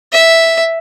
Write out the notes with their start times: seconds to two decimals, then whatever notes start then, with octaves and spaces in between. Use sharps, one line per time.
0.13 E5